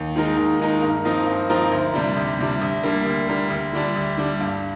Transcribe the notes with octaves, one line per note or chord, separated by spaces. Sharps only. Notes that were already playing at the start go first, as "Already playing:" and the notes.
Already playing: D#2
D#3 G#3 D#4 A#4
D#2
D#3 G#3 D#4 A#4
G2
F3 C4 D#4 A#4
G2
F3 C4 D#4 A#4
D2
C3 G3 D4
D2
C3 G3 D4
D2
D3 G3 A#3
D2
D3 G3 A#3
D2
D3 G3 D4
D2
D3 G3 D4
G2